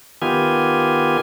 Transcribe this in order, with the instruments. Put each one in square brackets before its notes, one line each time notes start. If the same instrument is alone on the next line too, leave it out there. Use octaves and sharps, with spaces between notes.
[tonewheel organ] D#3 B3 F4 G4 G#5